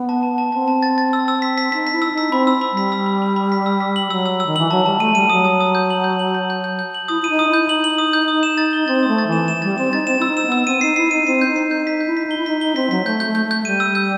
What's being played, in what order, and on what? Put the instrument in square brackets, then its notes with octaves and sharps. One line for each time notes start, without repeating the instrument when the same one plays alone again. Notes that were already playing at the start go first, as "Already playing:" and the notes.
Already playing: [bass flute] B3
[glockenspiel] A5
A5
A5
[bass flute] C4 [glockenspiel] A5
[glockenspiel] A5
A6
A6
E6
E6
B6
B6
[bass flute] D#4 [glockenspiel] B6
[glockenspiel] B6
[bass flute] E4
[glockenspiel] E6
[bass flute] D#4
[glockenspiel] B6
[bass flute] C4 [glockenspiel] B5
[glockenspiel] E6
B5
[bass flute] G3 [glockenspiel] B6
[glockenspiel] E6
B5
B5
B5
B6
E6
B6
F#7
[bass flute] F#3 [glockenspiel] E6
[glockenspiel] E6
E6
[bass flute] D#3
[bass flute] E3 [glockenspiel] F#7
[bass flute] F#3 [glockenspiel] A5
[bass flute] G3 [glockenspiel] A5
[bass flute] A3 [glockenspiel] D#7
[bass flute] G3 [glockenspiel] D#7
[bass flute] F#3 [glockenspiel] D#6
[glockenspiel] D#6
D#6
G6
F#7
G6
F#7
G6
G6
G6
G6
F#7
[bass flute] E4 [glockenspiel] D#6
[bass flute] E4 [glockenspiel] D#7
[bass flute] D#4
[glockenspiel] D#6
[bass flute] E4 [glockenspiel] G6
[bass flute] D#4 [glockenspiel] F#7
[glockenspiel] F#7
D#6
G6
D#6
E7
A6
G7
[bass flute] C4 [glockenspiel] A6
[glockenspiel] D#6
[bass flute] A3
[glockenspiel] A6
[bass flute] E3
[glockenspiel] E7
E7
[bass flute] G3 [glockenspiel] A6
[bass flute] C4 [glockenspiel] E7
[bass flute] D#4 [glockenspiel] A6
[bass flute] C4 [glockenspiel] E7
[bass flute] E4 [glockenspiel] E6
[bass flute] D#4
[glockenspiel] E7
[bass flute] B3
[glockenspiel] E6
[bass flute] C4 [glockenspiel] D#7
[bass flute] D#4 [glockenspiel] C7
[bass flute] E4 [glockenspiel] C7
[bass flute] D#4 [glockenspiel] D#7
[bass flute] C4 [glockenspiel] C7
[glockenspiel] G6
[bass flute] D#4
[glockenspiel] C7
[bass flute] D#4 [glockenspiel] G6
[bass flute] D#4 [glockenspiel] B6
[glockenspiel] G6
[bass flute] E4
[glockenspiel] B6
[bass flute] D#4 [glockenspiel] G7
[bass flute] E4
[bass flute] D#4 [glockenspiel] B6
[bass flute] D#4 [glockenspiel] G7
[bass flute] C4 [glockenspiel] B6
[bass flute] F#3 [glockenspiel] B6
[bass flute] A3 [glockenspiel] G6
[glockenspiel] G6
[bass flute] A3
[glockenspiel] G6
[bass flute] A3
[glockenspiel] G6
[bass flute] G3 [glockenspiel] D#7
[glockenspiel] E6
G6